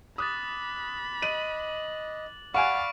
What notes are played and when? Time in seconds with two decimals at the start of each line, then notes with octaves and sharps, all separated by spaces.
0.18 B5 D6 D#6 F#6 A6
1.22 D#5 D#7 F#7
2.54 D5 F5 F#5 G#5 B5 C#6 D7